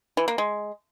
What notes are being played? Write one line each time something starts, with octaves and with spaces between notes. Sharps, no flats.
E3
A#3
G#3